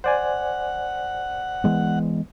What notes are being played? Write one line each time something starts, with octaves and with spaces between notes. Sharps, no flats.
C5 D5 F#5 G#5
E3 G#3 B3